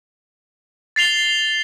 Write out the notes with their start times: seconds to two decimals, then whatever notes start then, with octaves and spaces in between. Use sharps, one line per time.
0.96 A6 C7 F7 G7